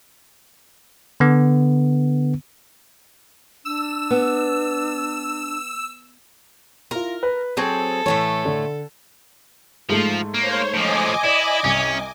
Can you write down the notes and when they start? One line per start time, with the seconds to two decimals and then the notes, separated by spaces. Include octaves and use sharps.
1.20 D3 B3
3.65 D4 E6
4.10 B3
6.91 E4 F4 A#4
7.23 B4
7.57 F#3 C4 G#4 A4 A5 G#6
8.06 A2 E3 A3 C#5
8.45 D3
9.89 G#2 F3 G#3 A3
10.34 A#3 C5 C#5
10.74 A2 F3 D#5 G#5 D6
11.24 E4 D5
11.64 C2 C#4